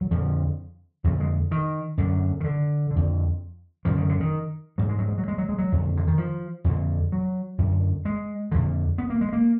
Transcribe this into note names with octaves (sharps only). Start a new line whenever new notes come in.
F#3
F2 D3 F3
F2 D3 F#3
G#3
D#3
F#2 D3
D#3
D3
D3
F2
F#2 D3 F3
D#3
D3
D#3
G#2 F#3
G#3
F#3
G#3
F#3
G#3
F#3
G#3
F#3
F2 D3
D3
D#3
F3
F2 D3
F#3
F#2 D3
G#3
F2 D3
B3
A#3
G#3
A#3